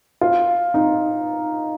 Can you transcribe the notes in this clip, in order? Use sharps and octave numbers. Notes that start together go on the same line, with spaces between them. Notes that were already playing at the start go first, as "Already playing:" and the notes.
F4
D#4